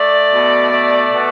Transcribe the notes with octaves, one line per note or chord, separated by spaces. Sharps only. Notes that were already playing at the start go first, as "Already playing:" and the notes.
Already playing: A3 D5
B2
A3
B2